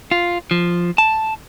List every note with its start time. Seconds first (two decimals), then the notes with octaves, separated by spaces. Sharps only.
0.11 F4
0.51 F3
0.98 A5